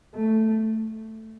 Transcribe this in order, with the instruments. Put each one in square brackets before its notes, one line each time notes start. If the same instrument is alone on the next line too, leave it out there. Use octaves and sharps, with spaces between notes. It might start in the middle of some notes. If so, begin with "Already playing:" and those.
[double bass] A3